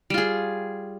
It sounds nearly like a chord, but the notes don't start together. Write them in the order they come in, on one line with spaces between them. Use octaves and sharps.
G3 F4 G#4